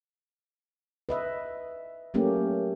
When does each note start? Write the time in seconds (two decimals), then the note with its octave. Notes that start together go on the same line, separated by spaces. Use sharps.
1.09 B4 D#5 E5
2.14 F#3 A3 A#3 C#4 G4